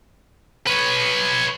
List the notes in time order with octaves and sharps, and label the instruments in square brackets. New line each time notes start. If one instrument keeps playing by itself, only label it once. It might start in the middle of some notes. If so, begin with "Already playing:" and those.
[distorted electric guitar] B4 C#5